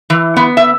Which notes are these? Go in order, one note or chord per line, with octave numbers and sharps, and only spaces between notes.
E3
B3
E5